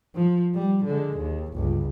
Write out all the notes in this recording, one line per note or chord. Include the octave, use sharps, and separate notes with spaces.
F3
G3
D3 G#3
D#2
G1 C#2